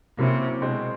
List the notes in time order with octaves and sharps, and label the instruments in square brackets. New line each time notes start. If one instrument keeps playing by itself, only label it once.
[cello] C3 [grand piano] F#3 A#3 C#4 E4
[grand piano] B2 G#3 C4